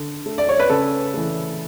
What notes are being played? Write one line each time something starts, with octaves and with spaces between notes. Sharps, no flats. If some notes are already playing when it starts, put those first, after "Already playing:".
Already playing: D3
A3
D5
C#5
B4
C#3 A4
E3 A3